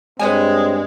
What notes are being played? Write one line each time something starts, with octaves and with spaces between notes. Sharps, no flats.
G2 G#3 C4 B4 C#5 G#5